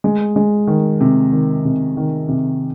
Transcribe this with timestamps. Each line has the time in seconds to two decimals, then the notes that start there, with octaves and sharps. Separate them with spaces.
0.04 G#3
0.36 G#3
0.67 D#3
1.01 C3
1.32 D#3
1.65 C3
1.97 D#3
2.29 C3